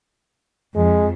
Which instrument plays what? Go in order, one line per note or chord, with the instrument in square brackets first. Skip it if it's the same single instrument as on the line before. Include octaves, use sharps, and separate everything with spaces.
[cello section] F2 [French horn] G#3